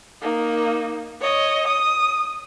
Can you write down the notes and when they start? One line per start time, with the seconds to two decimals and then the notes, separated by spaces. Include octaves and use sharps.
0.22 A#3 D#4
1.21 C#5 D#5
1.68 D#6